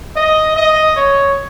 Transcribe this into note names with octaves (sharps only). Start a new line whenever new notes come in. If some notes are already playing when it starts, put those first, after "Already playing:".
D#5
D#5
C#5